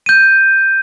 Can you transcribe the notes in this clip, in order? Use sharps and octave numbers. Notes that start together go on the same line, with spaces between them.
G6 D#7